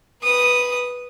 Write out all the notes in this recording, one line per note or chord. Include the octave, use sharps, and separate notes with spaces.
B4 D#6